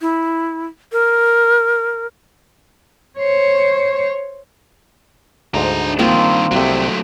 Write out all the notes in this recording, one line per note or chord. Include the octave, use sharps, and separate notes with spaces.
E4
A#4
C5 C#5
D2 G#2 D4 C5 A#5
G2 D#3 A#3 C4 F4
C2 C3 F#3 A3